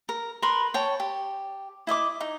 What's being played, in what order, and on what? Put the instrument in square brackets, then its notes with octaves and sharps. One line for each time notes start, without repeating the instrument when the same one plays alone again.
[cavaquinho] A#4
A#4 B4 B5 C6
C#5 G5 A5
G4
E4 D#5 E5 D6
D#4